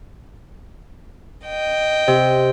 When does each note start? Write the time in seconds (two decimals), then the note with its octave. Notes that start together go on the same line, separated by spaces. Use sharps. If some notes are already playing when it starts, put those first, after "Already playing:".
1.47 D#5 G5
2.08 C3